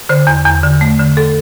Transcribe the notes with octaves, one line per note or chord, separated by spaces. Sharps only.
D3 C5
E2
E2
D3
A3
D3
A4